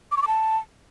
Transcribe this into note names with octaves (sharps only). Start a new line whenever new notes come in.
D6
C#6
D6
A5